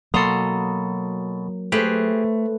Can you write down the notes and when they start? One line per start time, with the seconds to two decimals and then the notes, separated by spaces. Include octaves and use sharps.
0.14 B2 F#3 A#3 A4 A#5 C6 D#6
1.72 A3 G4 G#4 B4 C5